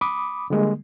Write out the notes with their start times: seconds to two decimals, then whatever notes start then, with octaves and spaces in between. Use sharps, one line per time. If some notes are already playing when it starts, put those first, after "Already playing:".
0.01 B5 D6 D#6
0.50 D3 G3 G#3 A#3